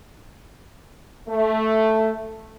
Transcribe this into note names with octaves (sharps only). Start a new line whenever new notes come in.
A3